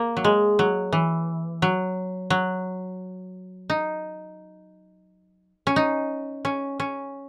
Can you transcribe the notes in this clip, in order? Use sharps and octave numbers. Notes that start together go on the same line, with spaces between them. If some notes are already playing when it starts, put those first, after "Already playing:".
Already playing: A#3
F#3
G#3
F#3
E3
F#3
F#3
D#4
C#4
D#4
C#4
C#4